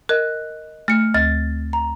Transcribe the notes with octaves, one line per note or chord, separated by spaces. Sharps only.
A#4 D#5 F#6
A3 F6 C#7
D2 A6
A#5